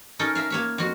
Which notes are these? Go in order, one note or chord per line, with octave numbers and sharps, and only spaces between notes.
C#4 D#4 A4 A#4
A#4 E5 F5
A#3 C#5 E5
F2 F#4